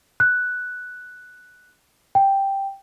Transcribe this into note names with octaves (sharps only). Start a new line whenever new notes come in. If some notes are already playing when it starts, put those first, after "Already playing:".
F#6
G5